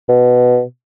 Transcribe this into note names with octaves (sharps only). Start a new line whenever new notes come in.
B2